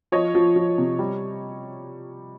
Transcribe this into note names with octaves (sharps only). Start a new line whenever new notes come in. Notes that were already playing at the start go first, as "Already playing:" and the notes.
F3 C#5 D#5
F3
F3
C3
G3